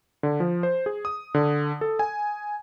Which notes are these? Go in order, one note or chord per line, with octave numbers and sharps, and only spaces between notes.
D3
F3
C5
G#4
D#6
D3
A4
G#5